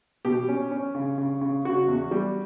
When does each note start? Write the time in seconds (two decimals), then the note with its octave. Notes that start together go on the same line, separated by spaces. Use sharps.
0.25 B2 G4
0.49 C#4
0.71 C#4
0.95 C#3
1.18 C#3
1.41 C#3
1.65 C#3 F#4
1.88 E2
2.11 G3